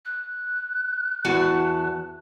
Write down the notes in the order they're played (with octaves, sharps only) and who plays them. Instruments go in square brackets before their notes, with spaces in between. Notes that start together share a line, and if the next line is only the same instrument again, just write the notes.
[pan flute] F#6
[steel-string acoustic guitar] E2 F#4 A5